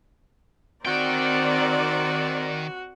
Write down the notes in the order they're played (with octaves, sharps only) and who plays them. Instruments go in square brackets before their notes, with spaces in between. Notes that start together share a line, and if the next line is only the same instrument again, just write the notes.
[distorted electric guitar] D#3 G5 [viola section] C4 A#4 D5 [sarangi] F#4